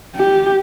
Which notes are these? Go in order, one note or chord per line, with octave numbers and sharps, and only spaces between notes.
G4